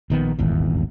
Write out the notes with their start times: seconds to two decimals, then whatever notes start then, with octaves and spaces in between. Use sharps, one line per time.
0.10 A#1 D#3 B3
0.39 D#1 G#1 E2